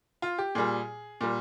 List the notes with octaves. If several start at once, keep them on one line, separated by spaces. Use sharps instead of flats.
F4
G4
A#2 G3 G#4
A#2 G3